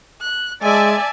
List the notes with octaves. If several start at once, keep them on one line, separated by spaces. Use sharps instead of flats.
F#6
G#3 D5 E5 G#5 A5